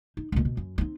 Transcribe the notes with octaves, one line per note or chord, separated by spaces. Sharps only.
D#4
C#2 A#2
B2
F#2
C4 D#4